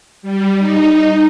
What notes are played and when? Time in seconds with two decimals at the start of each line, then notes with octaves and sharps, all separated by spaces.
0.22 G3
0.58 D#4